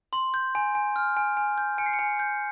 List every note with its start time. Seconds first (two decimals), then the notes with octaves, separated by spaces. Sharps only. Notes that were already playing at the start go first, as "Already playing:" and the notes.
0.13 C6
0.34 G6
0.55 G#5
0.75 G#5
0.96 F6
1.17 G#5
1.37 G#5
1.58 G6
1.78 G#5 C#7
1.86 C7
1.93 C#7
1.99 G#5
2.19 G6